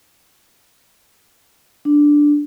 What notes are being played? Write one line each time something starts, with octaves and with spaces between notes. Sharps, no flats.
D4